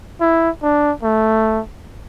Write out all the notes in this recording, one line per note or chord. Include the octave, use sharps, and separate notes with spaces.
E4
D4
A3